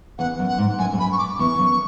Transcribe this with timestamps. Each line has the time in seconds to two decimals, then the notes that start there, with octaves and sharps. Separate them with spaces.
0.18 E2 F#5
0.39 F#2
0.48 F#5
0.58 G#2
0.79 F#2 G#5
0.93 G#2
0.98 F#2 B5
1.12 C#6
1.18 D6
1.39 E2 C#6
1.59 F#2